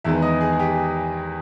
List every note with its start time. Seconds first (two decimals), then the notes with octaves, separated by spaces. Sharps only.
0.04 E2 D#3 G#3 B3 E5
0.22 D#5
0.41 G#4
0.53 G#4
0.59 G4